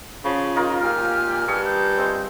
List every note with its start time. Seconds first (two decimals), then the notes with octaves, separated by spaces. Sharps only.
0.25 C#3 F3
0.56 D#4 F4 A#4
0.81 A#2 G4 G#5 F6
1.47 G2 G#4 C#6
1.65 G6
1.97 G#3 C4